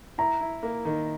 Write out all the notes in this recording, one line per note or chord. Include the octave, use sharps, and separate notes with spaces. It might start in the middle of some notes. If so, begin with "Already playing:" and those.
E4 A#5
E4
A#3
D#3